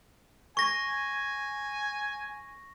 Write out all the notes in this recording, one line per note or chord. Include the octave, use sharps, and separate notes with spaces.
G#5 C#6 A#6